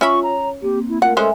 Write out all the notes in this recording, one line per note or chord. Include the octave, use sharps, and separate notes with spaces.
C#4 F4 E5 B5 C#6
C#5 A#5
A#3 C4 G4
E4
A3 F4 A#4 F#5
G#3 C#4 A4 C5 E5 G#5